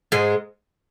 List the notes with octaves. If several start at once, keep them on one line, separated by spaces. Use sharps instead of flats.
G#2 G#3